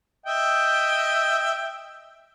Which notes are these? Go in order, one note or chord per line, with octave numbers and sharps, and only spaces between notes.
D#5 E5 G5